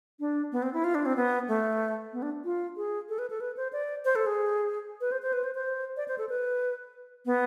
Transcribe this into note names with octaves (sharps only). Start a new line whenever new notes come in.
D4
B3
C4
E4
F4
D4
C4
B3
A3
B3
D4
F4
G#4
A4
B4
A4
B4
C5
D5
C5
A4
G#4
B4
C5
C5
B4
C5
C5
D5
C5
A4
B4
B3